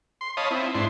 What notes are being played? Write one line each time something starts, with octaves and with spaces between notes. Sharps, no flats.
C6
C#5 D#5 F5 A5 B5 D#6
C4 E4
G#2 D4 E4 C6